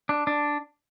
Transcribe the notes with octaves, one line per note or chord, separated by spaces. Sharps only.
D4
D4